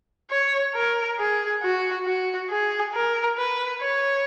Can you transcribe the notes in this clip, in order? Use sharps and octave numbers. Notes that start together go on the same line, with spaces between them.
C#5
A#4
G#4
F#4
F#4
G#4
A#4
B4
C#5